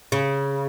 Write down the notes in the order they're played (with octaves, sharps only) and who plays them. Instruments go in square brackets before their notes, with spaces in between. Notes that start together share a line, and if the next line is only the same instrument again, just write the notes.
[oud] C#3